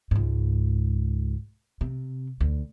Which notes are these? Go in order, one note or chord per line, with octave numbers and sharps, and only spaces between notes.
C#2 G#2
C3
D2